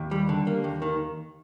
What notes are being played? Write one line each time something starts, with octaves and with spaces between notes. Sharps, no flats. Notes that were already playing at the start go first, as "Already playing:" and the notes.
Already playing: D#2
G3
D3
A#3
D#2
D#3